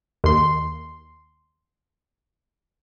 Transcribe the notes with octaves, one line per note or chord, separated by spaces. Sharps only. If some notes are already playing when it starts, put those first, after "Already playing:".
D#2 C6